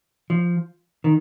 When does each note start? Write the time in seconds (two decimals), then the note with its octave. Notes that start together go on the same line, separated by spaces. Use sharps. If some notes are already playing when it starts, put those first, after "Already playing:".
0.30 F3
1.04 D#3